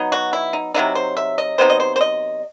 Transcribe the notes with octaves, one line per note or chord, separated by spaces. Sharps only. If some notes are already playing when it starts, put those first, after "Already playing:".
Already playing: F#3 B3 D#4
F#4
E4
D#4
C3 F#3 B3 D#4 E4
C5
E5
D#5
C3 F#3 B3 D#4 C5
D#5
C5
C5
D#5